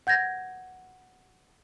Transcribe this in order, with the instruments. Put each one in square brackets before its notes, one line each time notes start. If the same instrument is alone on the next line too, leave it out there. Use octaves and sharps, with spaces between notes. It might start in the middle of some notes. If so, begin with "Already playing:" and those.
[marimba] F#5 G6 G#6 A#6